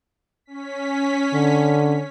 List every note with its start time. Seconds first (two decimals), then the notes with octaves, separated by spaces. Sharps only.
0.46 C#4 B6
1.34 D3